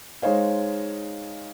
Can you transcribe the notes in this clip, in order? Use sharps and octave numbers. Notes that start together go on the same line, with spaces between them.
G#3 D#4 C5 C#5 F5